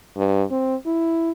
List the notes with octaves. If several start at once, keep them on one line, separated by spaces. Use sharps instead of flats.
G2
C4
E4